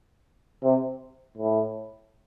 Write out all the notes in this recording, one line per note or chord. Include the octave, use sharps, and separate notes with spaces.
C3
A2